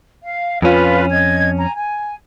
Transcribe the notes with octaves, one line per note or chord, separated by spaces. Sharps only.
F5
F2 C#4 F4 B4
D#5 G#6
G#5 A#5
G#5